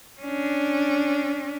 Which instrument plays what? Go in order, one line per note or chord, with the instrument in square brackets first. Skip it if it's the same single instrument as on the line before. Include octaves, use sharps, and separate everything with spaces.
[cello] C#4 D4